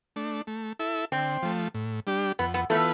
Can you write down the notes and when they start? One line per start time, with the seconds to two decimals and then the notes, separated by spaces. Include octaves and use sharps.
0.16 A3 D4
0.47 A3
0.79 E4 A4 E5
1.12 D3 C4
1.43 F3 A3
1.75 A2
2.07 G3 D4 G4
2.39 F2 B3
2.54 B3
2.70 E3 A3 B3 F4 B4